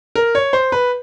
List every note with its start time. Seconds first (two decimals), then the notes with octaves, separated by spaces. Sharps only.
0.15 A#4
0.35 C#5
0.53 C5
0.72 B4